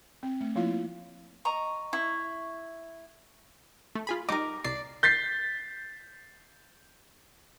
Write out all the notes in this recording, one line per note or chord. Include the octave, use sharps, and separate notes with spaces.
C4
A3
F3 A#3 E4 F4 F5
D#5 A#5 C#6
E4 C#6
A3
F4 G#4 B5
G3 D#4 A#4 D#5 D6
C2 D5 C7
G6 A6 B6 C7